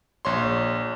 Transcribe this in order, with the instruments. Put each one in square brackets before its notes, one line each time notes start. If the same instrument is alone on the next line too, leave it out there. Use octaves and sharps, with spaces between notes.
[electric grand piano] A#1 C#5 C6